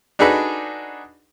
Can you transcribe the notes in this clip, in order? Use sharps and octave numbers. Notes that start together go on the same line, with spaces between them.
D4 D#4 F#4 G#4 A4 B4